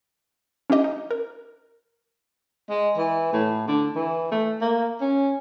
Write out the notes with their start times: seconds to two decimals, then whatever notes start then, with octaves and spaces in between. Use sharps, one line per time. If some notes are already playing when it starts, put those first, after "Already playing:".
0.70 C#4 D4 E4 G4 D#5
0.84 D#4
1.11 A#4
2.69 G#3
2.97 E3
3.33 A2
3.67 D3
3.96 E3
4.31 A3
4.61 A#3
5.01 C#4